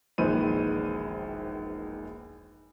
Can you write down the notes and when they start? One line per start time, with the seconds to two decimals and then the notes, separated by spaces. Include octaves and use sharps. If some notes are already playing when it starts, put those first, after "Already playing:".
0.18 E1 A#1 D#3 B4 C5 D#7